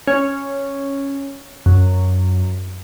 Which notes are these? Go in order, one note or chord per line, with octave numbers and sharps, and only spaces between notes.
C#4
F#2